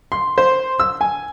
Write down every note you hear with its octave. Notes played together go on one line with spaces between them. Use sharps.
C6
C5
E6
G#5